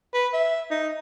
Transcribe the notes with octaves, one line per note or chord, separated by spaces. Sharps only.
B4
E5
D#4